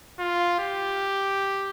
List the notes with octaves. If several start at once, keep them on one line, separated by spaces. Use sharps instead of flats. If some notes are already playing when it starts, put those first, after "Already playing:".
F4
G4